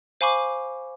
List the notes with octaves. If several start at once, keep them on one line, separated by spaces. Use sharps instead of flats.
C5 F5 G#5 B5 C#6 D6